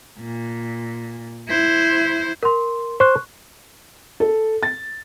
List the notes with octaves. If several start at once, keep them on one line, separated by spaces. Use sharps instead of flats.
A#2
E4 C5
A#4 C6
C5 C#6 F#6
A4
A6